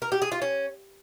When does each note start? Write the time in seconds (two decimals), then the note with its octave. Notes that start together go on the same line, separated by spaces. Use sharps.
0.02 A#4
0.12 G4
0.22 G#4
0.32 F4
0.42 C#4